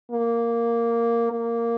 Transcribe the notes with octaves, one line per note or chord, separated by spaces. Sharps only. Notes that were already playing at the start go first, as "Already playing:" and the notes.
A#3
A#3